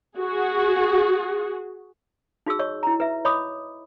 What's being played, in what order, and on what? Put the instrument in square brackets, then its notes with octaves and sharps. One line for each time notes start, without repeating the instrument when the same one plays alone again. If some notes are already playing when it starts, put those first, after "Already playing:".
[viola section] F#4 G#4
[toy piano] D#4 F#4 G#4 E6
C#5 D#5 C#6
E4 A#5
B4 E5
C#5 D#5 B5 D6 D#6